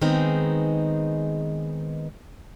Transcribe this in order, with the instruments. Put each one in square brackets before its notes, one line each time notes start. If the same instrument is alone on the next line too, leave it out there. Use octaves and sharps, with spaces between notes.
[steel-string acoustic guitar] D#3 G#3 B3 C4 D#4 G#4